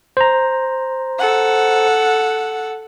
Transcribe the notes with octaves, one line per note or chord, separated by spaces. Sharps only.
C5 A#5
A4 F#5